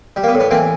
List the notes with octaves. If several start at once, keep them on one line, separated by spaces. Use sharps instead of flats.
G3
A#3
B3
A2
B3
E3 A#3 C4